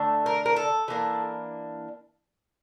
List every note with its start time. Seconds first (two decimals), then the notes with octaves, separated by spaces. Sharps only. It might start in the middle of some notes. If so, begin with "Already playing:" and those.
Already playing: D3 A3 D4
0.26 A#4
0.46 A#4
0.56 A4
0.88 E3 A#3 D4